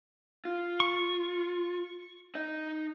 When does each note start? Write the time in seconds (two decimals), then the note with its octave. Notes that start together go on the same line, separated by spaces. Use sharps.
0.45 F4
0.80 C#6
2.35 D#4 D#5